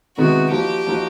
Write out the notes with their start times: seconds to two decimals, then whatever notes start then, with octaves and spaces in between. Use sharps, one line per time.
0.17 C3 D#3 G#3 B3 E4 F#4
0.51 F3 A#3 D#4 F#4 G4
0.86 F3 A#3 D#4 F#4